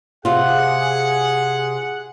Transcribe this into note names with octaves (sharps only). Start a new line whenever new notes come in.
C3 F4 G#4 F#5